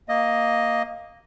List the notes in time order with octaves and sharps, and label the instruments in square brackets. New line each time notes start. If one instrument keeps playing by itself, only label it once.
[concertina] A#3 D#5